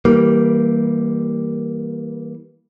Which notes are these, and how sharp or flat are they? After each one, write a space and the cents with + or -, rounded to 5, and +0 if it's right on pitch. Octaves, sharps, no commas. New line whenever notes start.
E3 -25 G3 -5 A#3 -5